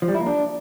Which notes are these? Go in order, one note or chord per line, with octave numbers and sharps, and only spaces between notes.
F3
G3
E4
A#3
D4